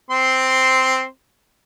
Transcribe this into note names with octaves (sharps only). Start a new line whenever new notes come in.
C4 C6